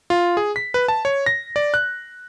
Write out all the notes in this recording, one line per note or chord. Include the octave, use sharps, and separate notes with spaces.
F4
G#4
B6
B4
A5
C#5
A#6
D5
F#6